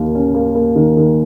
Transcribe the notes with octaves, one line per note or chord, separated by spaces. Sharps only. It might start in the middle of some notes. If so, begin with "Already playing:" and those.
Already playing: D#2 A#3
C#4
A#3
A#3
D#3
D#3